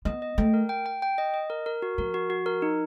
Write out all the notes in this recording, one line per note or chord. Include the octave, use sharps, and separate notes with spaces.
B3 D#5
D#5
A3 G5
A#4
G5
G5
G5
D#5
D#5
A#4
A#4
F#4
F3 A#4
F#4
F#4
A#4
D#4